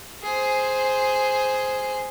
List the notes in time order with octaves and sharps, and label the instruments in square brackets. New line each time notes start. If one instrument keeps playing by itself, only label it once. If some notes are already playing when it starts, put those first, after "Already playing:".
[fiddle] G#4 C5